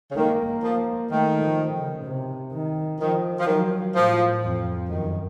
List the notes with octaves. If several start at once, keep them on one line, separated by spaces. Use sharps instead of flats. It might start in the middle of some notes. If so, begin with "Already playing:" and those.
C#3
D#3 A#3
F3 A#3
D#3 A3
F3
C#3
C3
D#3
D#3 F3
F3
D#3 F#3
A2 F3
F2
F#2 D#3